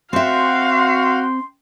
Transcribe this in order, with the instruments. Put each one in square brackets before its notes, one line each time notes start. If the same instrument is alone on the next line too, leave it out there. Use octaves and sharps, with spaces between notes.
[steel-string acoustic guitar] C4 E5 [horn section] F#4 [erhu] F5 [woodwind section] G5 C6